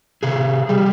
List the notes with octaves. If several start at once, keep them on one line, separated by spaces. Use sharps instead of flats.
C3 G#4
G3